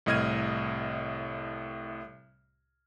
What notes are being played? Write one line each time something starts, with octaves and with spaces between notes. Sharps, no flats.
C2 A2 D#5 F6 G#6 D#7